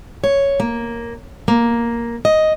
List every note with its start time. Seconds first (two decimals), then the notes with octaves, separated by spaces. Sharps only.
0.24 C#5
0.60 A#3
1.48 A#3
2.25 D#5